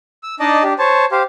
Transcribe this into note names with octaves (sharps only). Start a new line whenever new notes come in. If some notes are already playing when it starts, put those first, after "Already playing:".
E6
D4 D#4 D5 D#5 A5
D4 G4
C5 C#5 A5
G4 C5 F5